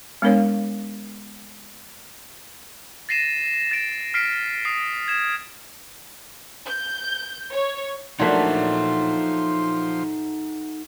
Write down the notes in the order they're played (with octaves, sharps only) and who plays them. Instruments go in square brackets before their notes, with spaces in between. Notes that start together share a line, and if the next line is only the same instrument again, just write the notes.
[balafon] G#3 B3 D4 A#4 C#5 F5
[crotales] A6 A#6 C7 D#7 E7
A6 D7 E7
F6 B6 C7 D7
D#6 C7
G#6 E7
[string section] G6
C#5
[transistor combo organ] F3 C6 [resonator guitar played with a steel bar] F#3 A3 [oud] A#3 D4 [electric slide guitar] D#4 F#5